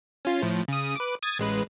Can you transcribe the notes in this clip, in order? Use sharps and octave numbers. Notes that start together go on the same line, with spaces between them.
C#4 F4
A2 F3
C#3 D#6
B4 D6
D#6 G#6 A6
A1 G#3 B4